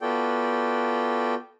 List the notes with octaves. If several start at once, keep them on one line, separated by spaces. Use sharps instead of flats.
B3 F4 F#4 A4 D5 G5